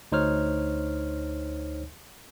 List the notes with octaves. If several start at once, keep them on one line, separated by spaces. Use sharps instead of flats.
D2 D#4 C5 C#5 F6